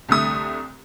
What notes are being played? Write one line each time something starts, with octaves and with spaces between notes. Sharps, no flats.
C2 D3 A3 D#6